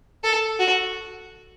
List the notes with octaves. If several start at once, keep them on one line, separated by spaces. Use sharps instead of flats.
A4
F#4